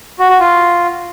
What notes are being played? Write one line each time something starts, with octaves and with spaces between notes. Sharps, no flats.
F#4
F#4
F4